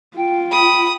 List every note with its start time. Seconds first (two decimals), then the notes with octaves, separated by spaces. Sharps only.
0.17 F4 G5
0.52 B5 D#6